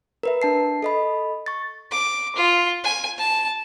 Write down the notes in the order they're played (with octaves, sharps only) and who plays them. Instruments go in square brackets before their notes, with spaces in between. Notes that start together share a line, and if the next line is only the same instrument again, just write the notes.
[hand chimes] A#4 B4 E5
D4 A5 C7
A4 D#5 B5
C#6 A6
[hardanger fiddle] D6
F4
G#5
A5